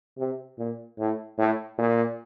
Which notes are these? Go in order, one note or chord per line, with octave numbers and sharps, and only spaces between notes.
C3
A#2
A2
A2
A#2